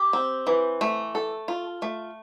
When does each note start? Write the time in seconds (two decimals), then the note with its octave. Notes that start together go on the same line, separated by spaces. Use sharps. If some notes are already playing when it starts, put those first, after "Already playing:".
Already playing: G4
0.13 C4
0.47 E3
0.81 A3
1.15 A4
1.48 F4
1.82 A3